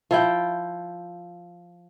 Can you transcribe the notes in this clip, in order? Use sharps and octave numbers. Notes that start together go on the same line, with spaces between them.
F3 E4 G5